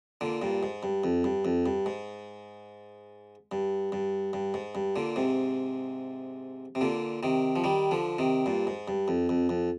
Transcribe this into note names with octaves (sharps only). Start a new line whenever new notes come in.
A#2 D3
G2 A#2
G#2
G2
F2
G2
F2
G2
G#2
G2
G2
G2
G#2
G2
A#2 D3
G#2 C3
C3
A#2 D3
C3 D#3
F3
D#3 G3
D3 F3
C3 D#3
G2 A#2
G#2
G2
F2
F2
F2